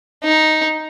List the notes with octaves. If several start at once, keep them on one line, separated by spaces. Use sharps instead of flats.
D#4